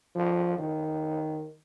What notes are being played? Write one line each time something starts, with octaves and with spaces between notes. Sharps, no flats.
F3
D#3